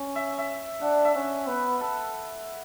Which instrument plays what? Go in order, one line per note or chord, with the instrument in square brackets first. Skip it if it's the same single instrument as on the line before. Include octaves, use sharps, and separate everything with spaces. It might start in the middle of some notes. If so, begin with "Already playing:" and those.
Already playing: [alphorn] C#4
[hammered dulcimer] E5
E5
[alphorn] D4 [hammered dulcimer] F#5
[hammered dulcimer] E5
[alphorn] C#4
[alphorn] B3 [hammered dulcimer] B4
[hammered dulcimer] A4